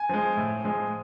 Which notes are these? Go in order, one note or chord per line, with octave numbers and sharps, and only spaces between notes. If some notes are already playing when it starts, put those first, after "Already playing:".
Already playing: G#5
F3 G#3
A2
F3 G#3